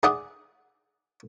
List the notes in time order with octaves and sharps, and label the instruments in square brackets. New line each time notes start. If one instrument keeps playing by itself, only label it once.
[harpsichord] G#4 D5 E5 F#5 D6 D#6